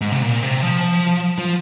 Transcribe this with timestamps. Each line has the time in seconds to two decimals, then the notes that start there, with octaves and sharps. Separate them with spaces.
0.01 G#2
0.12 C3
0.22 A#2
0.43 C3
0.63 F3
1.38 F3